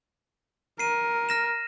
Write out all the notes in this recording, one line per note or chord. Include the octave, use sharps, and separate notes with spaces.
A#4 C7 D#7
F6 A#6 E7